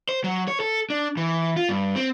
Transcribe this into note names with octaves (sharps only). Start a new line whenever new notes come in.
C5
F#3
C#5
A4
D4
E3
F4
G2
C4